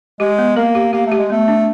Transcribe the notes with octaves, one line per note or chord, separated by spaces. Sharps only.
G#3 G4
B3
A#3 A#4
G4
A#3 G4
A3
G4
G#3
A3 B3
D4